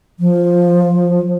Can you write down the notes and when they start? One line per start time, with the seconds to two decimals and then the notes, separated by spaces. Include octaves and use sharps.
0.19 F3